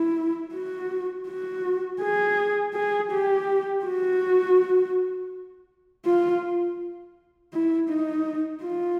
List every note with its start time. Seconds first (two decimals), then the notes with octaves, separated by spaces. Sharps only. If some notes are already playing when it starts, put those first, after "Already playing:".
Already playing: E4
0.54 F#4
1.28 F#4
2.01 G#4
2.74 G#4
3.12 G4
3.86 F#4
6.06 F4
7.53 E4
7.89 D#4
8.63 F4